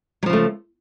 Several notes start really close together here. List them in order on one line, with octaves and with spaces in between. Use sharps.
F#3 F3 C#3 A3